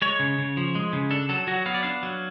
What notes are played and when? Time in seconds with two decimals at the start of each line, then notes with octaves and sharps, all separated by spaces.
0.02 G#3 C#5
0.20 C#3
0.38 C#3
0.57 F3
0.75 G#3
0.93 C#3
1.11 D4 A4
1.29 F#3 A4
1.47 F#3 F#4
1.66 B3 F5
1.74 D5
1.83 D4 F5
2.03 F#3